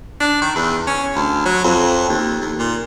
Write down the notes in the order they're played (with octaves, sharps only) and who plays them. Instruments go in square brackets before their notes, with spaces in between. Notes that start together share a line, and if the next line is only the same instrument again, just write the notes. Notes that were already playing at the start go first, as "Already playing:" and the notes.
[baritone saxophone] D4
D#3
E2
C#4
D2
F#3
F2
D#2
D#2
A#2